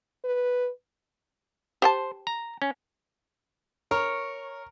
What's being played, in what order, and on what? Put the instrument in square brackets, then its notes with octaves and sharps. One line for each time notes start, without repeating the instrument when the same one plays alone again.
[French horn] B4
[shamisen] G4 G5 A5 [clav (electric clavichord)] C5
[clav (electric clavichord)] A#5
C#4
[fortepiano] A#4 [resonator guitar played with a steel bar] C#5